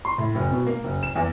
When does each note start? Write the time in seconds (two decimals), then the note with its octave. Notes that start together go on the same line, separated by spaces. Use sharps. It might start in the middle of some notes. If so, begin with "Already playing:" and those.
0.05 C6
0.18 A2
0.35 F#1
0.52 B2
0.67 A#3
0.84 F#1
1.03 E7
1.15 E2